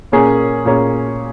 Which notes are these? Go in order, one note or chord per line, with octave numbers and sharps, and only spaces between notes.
A#2 A#3 C#4 G#4 C#5
A#2 A#3 C#4 G#4 C#5